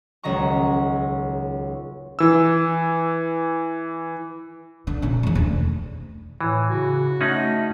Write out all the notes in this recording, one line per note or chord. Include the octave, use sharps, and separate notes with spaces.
D#1 C#2 F#3 D#5 A#5 C#6
E3 E6
D3
A#2 C#3
E1 E2
D2
A2 E3
C#3 F#4
A3 C#4 D#4 F#5